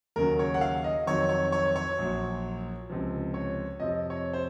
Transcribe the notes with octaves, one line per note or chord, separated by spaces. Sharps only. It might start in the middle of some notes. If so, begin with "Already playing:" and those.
D#2 C#3 F#3 A#4
C#5
F#5
F5
D#5
F2 D#3 F#3 C#5
C#5
C#5
C#5
A#1 A#2 F#3
C#2 C3 F3
C#5
F2 C3 F3 D#5
C#5
C5